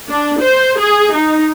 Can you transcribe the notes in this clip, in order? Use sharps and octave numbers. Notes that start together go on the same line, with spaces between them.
D4
C5
G#4
D#4